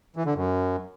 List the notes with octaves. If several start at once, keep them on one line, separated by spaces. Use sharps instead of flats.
E3
D3
F#2